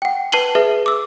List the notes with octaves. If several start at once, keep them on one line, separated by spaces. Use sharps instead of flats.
F#5 G5
B4 A5 C7 D#7 F#7 G7
G#4 B4 E5
D6 E6